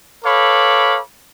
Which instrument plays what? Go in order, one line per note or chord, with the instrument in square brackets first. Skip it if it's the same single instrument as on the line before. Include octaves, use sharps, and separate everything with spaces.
[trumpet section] A4 B4 C#5 F5 B5 D6